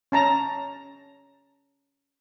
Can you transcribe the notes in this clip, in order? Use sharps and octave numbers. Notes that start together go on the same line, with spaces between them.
C#4 A5 A#5